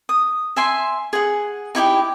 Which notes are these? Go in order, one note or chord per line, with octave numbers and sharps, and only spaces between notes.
D#6
E5 G#5 C6
G#4 F#5
D#4 E4 G4 G5